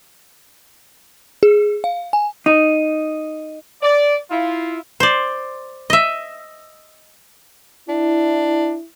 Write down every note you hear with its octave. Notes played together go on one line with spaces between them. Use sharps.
G#4
F5
G#5
D#4
D5
E4 F4
C5 D5
D#5 E5
D4 E4